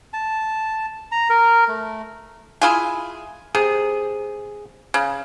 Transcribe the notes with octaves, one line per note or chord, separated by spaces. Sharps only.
A5
A#5
A#4
A3
E4 F4 G#4
C3 G#4
C#3